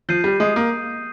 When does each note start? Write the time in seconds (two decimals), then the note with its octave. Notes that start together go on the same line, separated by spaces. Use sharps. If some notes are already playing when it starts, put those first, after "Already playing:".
0.09 F3 G6 C7 D#7
0.24 G3
0.40 G#3 D#6
0.56 A#3